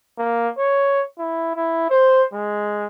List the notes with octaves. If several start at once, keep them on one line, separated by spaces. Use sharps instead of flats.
A#3
C#5
E4
E4
C5
G#3